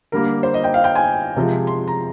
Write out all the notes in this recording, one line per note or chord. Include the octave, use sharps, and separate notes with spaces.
D3 G3 A#3 A#4
C5
D#5
G5
F5
G5
G#5
C3 F3 G#3
C6
A#5